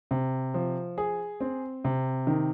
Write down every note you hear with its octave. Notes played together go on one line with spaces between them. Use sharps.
C3
F3
G#4
C4
C3
D#3